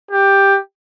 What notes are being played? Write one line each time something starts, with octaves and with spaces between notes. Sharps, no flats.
G4